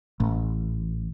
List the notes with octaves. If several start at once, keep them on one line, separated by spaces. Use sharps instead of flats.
A1